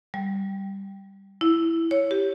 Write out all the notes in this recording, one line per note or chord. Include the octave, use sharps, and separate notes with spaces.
G3
E4
C#5
G4